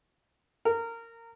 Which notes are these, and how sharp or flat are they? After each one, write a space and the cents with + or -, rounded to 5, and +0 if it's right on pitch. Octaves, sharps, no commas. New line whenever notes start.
A#4 -20